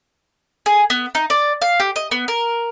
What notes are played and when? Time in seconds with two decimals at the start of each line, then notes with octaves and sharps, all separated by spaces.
0.66 G#4
0.90 B3
1.15 D#4
1.30 D5
1.62 F5
1.80 G4
1.96 D#5
2.11 B3
2.28 A#4